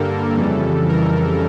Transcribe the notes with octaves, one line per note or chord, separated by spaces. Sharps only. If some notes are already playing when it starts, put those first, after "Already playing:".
Already playing: G2 D3 G3 A#3 A4 A#4
F2 C#3 E3 G3
A#4